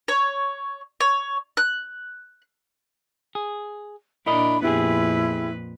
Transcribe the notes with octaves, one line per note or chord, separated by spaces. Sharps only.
C#5
C#5
F#6
G#4
A#2 D4 E4 A#4 D#5 B5
F2 A#2 B3 E4 G4 G#4 B4